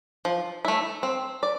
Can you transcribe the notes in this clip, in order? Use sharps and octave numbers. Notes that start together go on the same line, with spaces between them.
F3
A3 E4
C4
D5